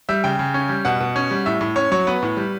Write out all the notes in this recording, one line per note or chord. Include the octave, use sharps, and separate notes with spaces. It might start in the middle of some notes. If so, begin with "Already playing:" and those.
G3 E5
C#3 G5
C#3
C#4
G3
B2 F#5
B2
C#4
G3
A2 E5
A2
C#4 C#5
F#3 C#5
B3 B4
A2
G3